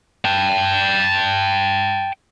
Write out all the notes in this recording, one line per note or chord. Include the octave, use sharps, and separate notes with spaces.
G5 A5